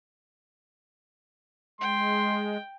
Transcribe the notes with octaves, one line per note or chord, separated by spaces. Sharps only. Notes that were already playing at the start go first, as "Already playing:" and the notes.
G#3 G5 C6